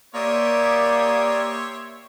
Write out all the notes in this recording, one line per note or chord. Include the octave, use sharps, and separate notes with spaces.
A#3 G4 C#5 D5 E5 C6 D#6